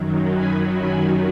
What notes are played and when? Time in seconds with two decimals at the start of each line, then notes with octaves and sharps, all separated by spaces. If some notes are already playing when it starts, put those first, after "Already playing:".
Already playing: F#2 D#3 F#3
0.33 G#5 B5
0.77 G#5 B5